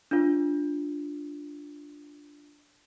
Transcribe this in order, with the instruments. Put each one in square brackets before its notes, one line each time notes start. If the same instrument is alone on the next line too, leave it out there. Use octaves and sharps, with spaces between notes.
[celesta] D4 F4